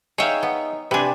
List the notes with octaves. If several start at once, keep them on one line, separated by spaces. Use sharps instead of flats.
D#4 G#4 C#5 E5 F5 G5
B3
C3 D4 G4 B4 G#5